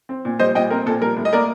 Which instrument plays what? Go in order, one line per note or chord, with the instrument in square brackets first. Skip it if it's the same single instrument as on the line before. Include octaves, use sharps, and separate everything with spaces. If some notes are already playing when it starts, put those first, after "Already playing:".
[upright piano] C4
A#2
G3 C5 D#5
A#2 D#5 G5
C4 A#4
A#2 A4
G3 A#4
A2
D#5
A#3 A#4 D5